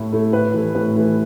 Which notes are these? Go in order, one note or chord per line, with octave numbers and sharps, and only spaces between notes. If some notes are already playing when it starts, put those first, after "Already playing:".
Already playing: A2 A3 E4
A3 E4
A2 B4
E3 A3 E4
A2 B4
E3 A3 E4